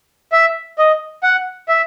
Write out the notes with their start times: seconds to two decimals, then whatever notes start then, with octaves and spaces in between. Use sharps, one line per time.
0.32 E5
0.78 D#5
1.23 F#5
1.68 E5